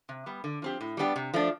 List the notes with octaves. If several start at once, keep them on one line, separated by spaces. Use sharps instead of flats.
C3
G3 B3
D3
F3 C4 G4
A2
G3 B3 D4 G4
C3
F3 A3 D4